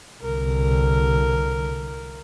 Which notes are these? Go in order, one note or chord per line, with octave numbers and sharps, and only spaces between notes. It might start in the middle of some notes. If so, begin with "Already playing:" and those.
C2 D3 A#4